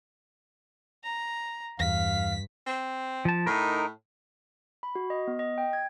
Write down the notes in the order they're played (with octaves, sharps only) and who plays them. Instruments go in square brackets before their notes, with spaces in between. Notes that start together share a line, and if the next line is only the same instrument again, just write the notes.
[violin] A#5
[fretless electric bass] E2 [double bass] G2 [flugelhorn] F5 [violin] B6
[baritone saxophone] C4
[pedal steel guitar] F3 A5
[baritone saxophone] A2 [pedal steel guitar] D#4 A#4
[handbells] B5
F#4
D#5
B3
D#5
G5
G#6